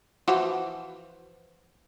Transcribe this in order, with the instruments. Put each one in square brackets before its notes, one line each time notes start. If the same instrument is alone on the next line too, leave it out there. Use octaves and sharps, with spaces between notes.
[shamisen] E3 F3 F#4